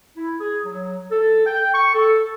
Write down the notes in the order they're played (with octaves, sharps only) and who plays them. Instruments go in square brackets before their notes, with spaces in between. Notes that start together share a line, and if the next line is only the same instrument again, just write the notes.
[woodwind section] E4
G#4
F#3
A4
G5
C#6
A4